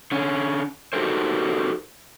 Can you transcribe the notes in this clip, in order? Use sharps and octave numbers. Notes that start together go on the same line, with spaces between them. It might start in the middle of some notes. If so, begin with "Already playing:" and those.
D3 C#4
D#4 F#4 G4 A4 A#4 C5